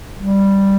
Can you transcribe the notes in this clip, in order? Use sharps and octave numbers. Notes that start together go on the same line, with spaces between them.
G3